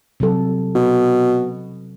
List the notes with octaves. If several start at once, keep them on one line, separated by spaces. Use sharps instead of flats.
C3 F#3 A4
B2